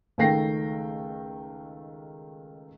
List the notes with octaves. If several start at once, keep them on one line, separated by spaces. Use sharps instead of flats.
C#2 D#3 A3 G5 A#6 C7